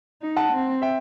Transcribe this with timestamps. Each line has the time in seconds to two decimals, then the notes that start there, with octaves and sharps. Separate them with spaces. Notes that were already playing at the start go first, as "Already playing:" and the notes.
0.22 D#4
0.36 F#5 A5
0.52 C4
0.82 E5 G5